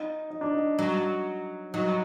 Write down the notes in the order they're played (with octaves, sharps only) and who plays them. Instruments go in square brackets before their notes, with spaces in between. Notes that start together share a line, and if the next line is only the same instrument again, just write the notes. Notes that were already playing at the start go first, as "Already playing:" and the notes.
Already playing: [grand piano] D#4
D#4
D4
D#4
[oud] F#3
[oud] F#3 [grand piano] D#4